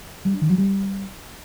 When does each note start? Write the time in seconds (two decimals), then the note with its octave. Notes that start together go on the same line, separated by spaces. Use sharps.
0.25 G3
0.33 D4
0.41 D#3
0.50 F#3
0.58 G3